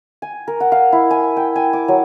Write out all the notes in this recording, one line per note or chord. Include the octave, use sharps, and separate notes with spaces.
G#5
A#4
F#5
F5
E4
G#5
G5
G#5
D6
F#3